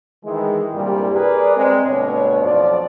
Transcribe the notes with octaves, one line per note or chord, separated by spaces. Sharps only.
D#3 E3 G#3
C2 G2 A#2 G3
G#4 A#4 B4 D5
G#3 C4
D2 G2 B2 C#5
B1 F2 F3 D5